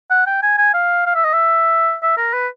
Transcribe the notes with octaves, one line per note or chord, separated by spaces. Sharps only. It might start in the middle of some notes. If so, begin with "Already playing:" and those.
F#5
G5
G#5
G#5
F5
F5
E5
D#5
E5
E5
A#4
B4